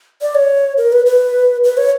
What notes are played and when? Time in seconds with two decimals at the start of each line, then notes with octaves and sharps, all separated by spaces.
0.22 D5
0.35 C#5
0.77 A#4
0.92 B4
1.06 B4
1.64 B4
1.77 C#5